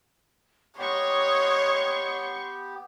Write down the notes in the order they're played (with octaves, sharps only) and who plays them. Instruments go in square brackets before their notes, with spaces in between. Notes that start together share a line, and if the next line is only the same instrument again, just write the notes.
[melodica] B3 G4 [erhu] C#5 [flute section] D#5 D#6 F#6 [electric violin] C6 C#6